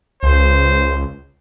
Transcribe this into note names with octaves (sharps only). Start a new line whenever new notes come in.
C#2 C5